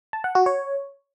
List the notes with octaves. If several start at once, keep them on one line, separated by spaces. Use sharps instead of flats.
A5
F#5
F#4
C#5